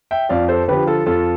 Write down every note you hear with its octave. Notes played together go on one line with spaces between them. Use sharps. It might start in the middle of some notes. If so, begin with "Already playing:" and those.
E5 G5
F2 D5 F5
A4 C5
D3 F3 G4 B4
F4 A4
F2 F4 A4